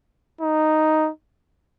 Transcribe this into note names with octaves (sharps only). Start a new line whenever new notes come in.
D#4